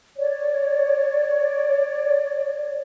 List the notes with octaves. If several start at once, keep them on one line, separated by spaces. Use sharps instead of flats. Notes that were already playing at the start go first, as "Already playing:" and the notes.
C#5 D5